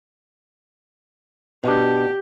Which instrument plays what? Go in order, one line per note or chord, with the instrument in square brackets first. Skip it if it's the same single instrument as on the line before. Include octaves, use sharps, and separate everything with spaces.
[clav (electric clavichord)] B2 D4 [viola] G4